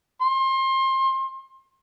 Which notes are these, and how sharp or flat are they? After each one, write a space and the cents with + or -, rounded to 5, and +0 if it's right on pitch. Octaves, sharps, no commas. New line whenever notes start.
C6 +30